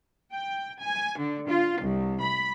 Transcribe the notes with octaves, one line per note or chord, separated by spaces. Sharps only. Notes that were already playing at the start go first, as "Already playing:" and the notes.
G5
G#5
D3
F4
C2
B5